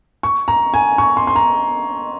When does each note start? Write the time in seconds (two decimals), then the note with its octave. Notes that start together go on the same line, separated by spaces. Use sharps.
0.23 C#6
0.48 A#5
0.74 G#5
0.98 C#6
1.17 C6
1.27 C6
1.36 A#5